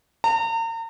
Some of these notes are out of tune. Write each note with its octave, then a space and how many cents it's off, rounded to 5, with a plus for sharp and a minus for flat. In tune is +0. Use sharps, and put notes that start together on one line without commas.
A#5 -40